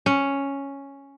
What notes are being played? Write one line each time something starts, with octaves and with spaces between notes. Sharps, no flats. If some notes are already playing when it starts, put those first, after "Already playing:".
C#4